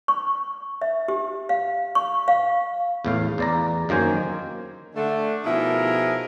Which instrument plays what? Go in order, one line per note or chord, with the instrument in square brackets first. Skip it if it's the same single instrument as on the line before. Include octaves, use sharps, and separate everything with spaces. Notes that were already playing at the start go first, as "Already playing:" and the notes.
[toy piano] C#6
E5
G4
F5
C#6
F5
[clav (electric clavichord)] E2 A2 F5
E2 D5 A#5
F#2 D#3 A#3 C5 G#5
[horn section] D3 A3 D4
B2 F3 D#4 E4 G#4 A#4